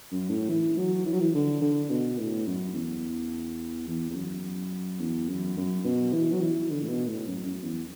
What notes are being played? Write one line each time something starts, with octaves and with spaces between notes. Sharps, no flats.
F#2
A2
E3
F#3
E3
F#3
E3
D3
D3
B2
A2
F#2
E2
E2
E2
F#2
E2
F#2
F#2
B2
E3
F#3
E3
D3
A2
B2
A2
F#2
F#2
E2